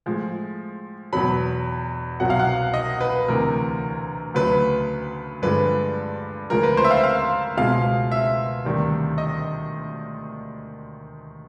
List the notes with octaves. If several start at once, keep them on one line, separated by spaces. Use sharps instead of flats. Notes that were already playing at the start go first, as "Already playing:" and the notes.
A2 F3 G#3
E2 B2 F#3 B5
C2 B2 F#3 F#5
F5
F#5
D#5
B4
D2 C3 E3 A#4
D2 C#3 F#3 B4
G2 D3 F3 G#3 B4
D2 C#3 F3 G#3 A#4
B4
C5
E5
F5
F5
C#2 B2 G#3 F5
E5
D2 C3 D#3 G3
D#5